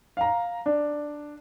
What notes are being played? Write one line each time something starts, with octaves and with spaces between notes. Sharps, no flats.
F5 A#5
D4